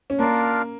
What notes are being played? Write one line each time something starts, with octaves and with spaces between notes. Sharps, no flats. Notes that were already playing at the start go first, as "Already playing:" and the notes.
C#4
A#3 D4 F4 A#4 D5 F5